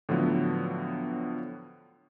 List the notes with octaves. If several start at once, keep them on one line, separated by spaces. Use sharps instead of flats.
A2 D3 F3 F#3 B3